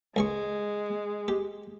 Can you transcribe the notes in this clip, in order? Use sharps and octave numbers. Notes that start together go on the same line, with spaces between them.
C#2 G#3 G#4 C#6
G4